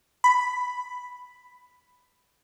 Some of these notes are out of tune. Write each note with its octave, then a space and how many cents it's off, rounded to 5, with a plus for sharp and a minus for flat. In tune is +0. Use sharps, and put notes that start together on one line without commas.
B5 +5